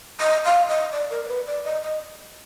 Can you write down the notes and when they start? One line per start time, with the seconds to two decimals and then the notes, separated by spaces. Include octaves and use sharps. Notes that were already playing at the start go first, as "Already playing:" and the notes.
0.20 D#5
0.45 F5
0.68 D#5
0.92 D5
1.10 A#4
1.23 D5
1.28 B4
1.47 D5
1.65 D#5
1.82 D#5